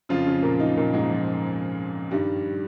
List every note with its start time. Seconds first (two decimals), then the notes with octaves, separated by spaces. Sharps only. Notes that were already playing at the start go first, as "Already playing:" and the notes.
0.09 F2 C#3 F3 F4
0.26 C#3 C#4
0.43 A#2 A#3
0.60 D#3 D#4
0.77 A#2 A#3
0.93 G#2 G#3
1.10 F3
2.11 G2 D#3 G3